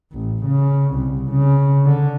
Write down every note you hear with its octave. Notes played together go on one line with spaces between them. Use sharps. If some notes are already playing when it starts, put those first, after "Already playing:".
A1
C#3
C2
C#3
D3